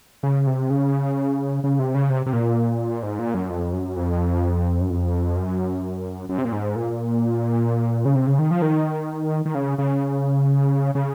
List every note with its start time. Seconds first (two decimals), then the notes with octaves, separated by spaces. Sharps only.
0.23 C#3
0.47 C3
0.70 C#3
1.64 C#3
1.79 C3
1.95 C#3
2.10 C3
2.26 C3
2.33 A#2
3.03 G#2
3.19 A#2
3.34 F#2
3.50 F2
3.73 F#2
3.96 F2
4.81 F#2
4.90 F2
5.36 F#2
6.29 F#2
6.38 C3
6.45 A#2
6.52 G#2
6.76 A#2
8.05 C#3
8.15 C3
8.27 C#3
8.39 D#3
8.51 F3
8.62 D#3
9.45 D#3
9.55 C#3
9.78 C#3
10.95 C#3